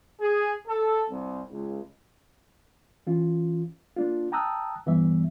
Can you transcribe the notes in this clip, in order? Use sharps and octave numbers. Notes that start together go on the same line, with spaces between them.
G#4
A4
C2
C#2
E3 C#4 F4
A#3 D4 F4
G5 A5 A#5 D#6 E6 F#6
G2 E3 G3 B3 E5